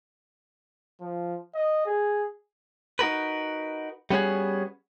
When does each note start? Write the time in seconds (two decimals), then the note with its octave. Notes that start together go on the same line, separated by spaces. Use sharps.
1.01 F3
1.55 D#5
1.86 G#4
2.99 D#4 F#4 A#4 B4
4.10 G3 B3 C#4 D4 F#4 G#4